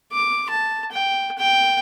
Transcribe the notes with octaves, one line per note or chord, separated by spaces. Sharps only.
D6
A5
G5
G5